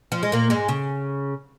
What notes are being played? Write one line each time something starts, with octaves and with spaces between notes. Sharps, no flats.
F3
G#3
A#2 A#3
G#2 G#3
C#3